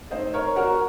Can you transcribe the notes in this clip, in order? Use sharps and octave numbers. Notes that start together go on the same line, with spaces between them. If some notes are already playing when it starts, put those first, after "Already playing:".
D#3 A3 C4 C5 D#5
A#4 C#5
F#4 A#4